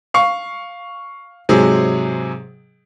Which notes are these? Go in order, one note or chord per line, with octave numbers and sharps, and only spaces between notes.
F5 C#6
G#2 C3 F#3 G#4